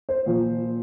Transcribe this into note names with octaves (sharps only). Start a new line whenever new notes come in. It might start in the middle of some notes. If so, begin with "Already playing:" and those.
C5
A#2 F3